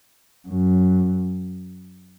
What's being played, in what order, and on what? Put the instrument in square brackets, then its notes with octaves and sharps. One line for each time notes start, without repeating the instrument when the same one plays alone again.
[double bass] F#2